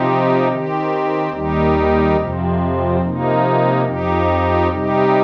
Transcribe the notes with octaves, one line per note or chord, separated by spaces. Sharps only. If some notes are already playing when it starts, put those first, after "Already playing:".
Already playing: C3 F3 C4 D#4 G4
D#3 C4 G4
D#2 D#3 G3 D#4 G4
F2 C3 F3 C4
C3 F3 A#3 D#4
F2 F3 D#4 G4
C3 G3 D#4 G4